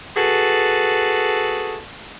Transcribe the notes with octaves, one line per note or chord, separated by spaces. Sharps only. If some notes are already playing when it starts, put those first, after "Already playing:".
F#4 G#4 A4 B4